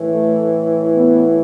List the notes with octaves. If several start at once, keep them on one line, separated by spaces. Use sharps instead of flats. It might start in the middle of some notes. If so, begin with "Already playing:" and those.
Already playing: A2 E3
A3
B3